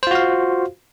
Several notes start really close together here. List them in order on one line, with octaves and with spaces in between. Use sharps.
C5 F4 F#4 F5